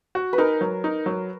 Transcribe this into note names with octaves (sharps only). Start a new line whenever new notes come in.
F#4
B4
D#4 A#4
F#3
D#4
F#3